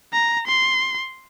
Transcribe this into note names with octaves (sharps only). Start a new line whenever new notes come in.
A#5
C6